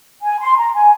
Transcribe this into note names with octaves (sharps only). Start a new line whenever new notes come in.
G#5
C6
A#5
G#5